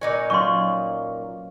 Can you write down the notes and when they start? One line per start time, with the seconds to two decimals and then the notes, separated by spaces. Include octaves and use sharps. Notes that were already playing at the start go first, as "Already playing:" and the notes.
0.01 A#2 D#4 B4 C#5 G#5
0.30 F#3 C#4 F4 C6 C#6